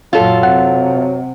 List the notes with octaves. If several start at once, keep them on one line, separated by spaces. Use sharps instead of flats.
F#2 A#2 F#3 F4 A4
C3 F#5